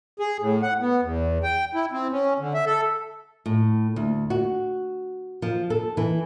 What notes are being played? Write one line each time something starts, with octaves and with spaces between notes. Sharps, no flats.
G#4
A2
F#5
B3
E2
G5
E4
C4
C#4
D3
E5
A4
A2
D2
F#4
F3
A4
E3